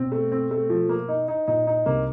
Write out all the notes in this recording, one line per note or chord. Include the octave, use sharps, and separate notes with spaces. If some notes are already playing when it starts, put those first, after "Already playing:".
Already playing: B2 C4
A3
C4
A3
F3
A#3
D#4
D#4
A#2 D#4
D#4
C2 C3 A#3